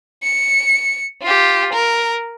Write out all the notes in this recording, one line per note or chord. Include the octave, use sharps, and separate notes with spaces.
C#7
F4 G4
A#4